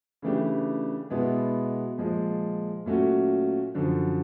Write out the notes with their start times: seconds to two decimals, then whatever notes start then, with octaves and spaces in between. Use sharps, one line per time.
0.22 C#3 E3 A3 D4 G4
1.10 B2 G#3 B3 E4
1.98 A#2 F3 G#3
2.86 A#2 F#3 A3 C#4 F#4
3.74 F#2 D3 F3